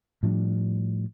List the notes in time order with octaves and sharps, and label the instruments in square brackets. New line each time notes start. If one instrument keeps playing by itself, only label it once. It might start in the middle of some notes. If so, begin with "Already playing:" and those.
[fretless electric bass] A2 F3 G3 D4